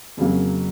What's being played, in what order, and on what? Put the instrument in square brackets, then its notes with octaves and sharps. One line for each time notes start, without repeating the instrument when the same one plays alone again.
[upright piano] F2 C#3 F#3 A#3